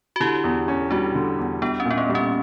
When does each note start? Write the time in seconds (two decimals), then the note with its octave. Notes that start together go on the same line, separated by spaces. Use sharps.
0.16 F#4
0.20 D3 E4 G4
0.44 E2
0.68 C#4
0.91 G3 D4 F#4
1.15 D3
1.39 E2
1.62 G3 B3 D4
1.80 C#4
1.85 A#2
1.91 B3
1.98 A#3
2.09 G3
2.15 C#4